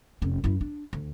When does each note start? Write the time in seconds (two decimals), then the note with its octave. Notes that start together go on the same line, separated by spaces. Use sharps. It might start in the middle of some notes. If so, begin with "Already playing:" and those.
0.22 F1 C#4
0.44 F#2 E4
0.61 D4
0.93 D2